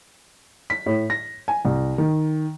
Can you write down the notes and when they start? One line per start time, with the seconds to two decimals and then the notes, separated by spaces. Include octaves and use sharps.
0.70 B6
0.86 A2
1.10 A#6
1.48 G#5
1.65 C2
1.98 D#3